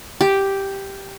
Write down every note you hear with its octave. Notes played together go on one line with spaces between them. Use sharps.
G4